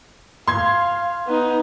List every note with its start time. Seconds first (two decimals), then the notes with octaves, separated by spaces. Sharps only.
0.48 F5 C6 G#6
1.27 B3 D#4